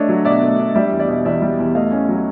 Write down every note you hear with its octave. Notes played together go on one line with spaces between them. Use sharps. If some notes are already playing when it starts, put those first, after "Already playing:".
Already playing: A3 D4 C#5 D#5
F#3
B2 D5 E5
A3
D4
G3 D5 E5
E2
D5 E5
B2
E2 D5 E5
G3
E2
A3 D#5 F5
C#4
F#3